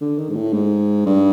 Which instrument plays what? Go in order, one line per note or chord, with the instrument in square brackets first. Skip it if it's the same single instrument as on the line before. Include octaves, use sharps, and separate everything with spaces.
[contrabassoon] D3
D#3
G#2
A2
G#2
G2